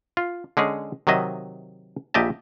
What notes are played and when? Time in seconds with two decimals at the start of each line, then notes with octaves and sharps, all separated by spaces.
0.17 F4
0.57 D3 G#3 C#4 G#4
1.07 C3 D#3 F#3 D#5 E5
2.14 A#1 A#2 G4 D#5 E5 A5